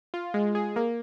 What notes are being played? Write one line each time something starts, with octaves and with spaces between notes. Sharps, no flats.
F4
G#3
G#4
A#3